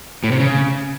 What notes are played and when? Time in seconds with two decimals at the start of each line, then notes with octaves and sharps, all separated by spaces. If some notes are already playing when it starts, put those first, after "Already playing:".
0.24 A2
0.32 C3
0.40 C#3